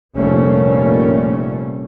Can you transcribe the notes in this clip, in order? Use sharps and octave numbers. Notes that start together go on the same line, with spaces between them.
F1 A#2 G3 A3 A#3 C#4